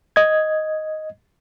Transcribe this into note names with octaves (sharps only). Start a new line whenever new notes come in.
D#5 G#6